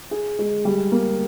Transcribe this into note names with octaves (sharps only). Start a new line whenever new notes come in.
G#4
G#3
G3
A#3